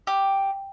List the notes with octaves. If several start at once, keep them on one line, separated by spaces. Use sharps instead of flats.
G4